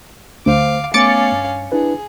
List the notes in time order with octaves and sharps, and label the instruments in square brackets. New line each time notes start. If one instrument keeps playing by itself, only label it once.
[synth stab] D2 [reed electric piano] A3 C5 [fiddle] F5 D6
[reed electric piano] A3 B3 [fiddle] C#4 F5 [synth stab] D6 A6 C#7
[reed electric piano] G2
[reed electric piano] D4 E4 B4 [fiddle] G#4